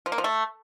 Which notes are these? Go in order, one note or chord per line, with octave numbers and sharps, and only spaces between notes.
F3
A#3
F3
A3